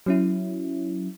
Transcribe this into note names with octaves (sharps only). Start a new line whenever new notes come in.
F#3 C#4 E4